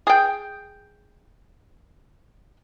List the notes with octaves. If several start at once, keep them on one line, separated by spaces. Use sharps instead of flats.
G#4 G5